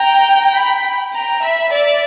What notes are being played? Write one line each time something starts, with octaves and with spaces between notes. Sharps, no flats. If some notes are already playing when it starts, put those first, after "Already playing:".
Already playing: G5 A#5
B5
G5 A#5
E5 B5
D5 E5